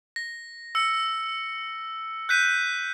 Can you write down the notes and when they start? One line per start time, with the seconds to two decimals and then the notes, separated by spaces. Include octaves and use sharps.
0.16 A#6
0.75 E6 C#7
2.29 F#6 G6 B6 D#7